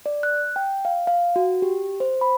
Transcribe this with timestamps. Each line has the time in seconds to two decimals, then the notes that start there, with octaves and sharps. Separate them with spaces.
0.06 D5
0.23 F#6
0.56 G5
0.85 F5
1.07 F5
1.36 F#4
1.62 G4
2.00 C5
2.21 B5